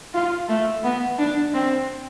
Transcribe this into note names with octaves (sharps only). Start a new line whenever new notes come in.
F4
A3
B3
D4
C4